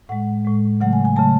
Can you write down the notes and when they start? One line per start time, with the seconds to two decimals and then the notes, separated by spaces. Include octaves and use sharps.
0.09 A2 G#3 F#5
0.45 A2 G#3
0.81 C#3 F#3 A3 F#5
0.93 G#5
1.05 G#5
1.16 C#3 F#3 A3 A5